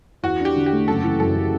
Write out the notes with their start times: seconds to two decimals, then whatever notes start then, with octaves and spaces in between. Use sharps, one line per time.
0.23 E2 F#4
0.40 D4
0.45 G4
0.56 D3
0.66 G4
0.72 A3
0.88 F#1 A4
1.04 E3
1.20 F#2 A4
1.36 C#3